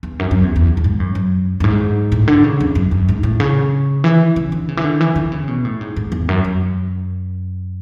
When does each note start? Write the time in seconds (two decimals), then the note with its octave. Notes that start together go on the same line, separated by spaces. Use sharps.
0.03 E2
0.19 F#2
0.31 F#2
0.44 E2
0.56 E2
0.77 F#2
0.84 G#2
1.00 F#2
1.15 F#2
1.60 F#2
1.64 G#2
2.12 A2
2.28 D3
2.44 C#3
2.60 E2
2.75 F#2
2.91 F#2
3.09 G#2
3.23 A2
3.40 C#3
4.04 E3
4.36 C#3
4.52 D3
4.68 C#3
4.77 E3
4.84 D3
5.01 E3
5.16 D3
5.32 C#3
5.48 B2
5.65 A2
5.81 G#2
5.96 G#2
6.12 E2
6.29 F#2
6.44 F#2